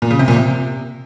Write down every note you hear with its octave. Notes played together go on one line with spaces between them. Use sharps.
A#2
C#3
C3
A#2
C3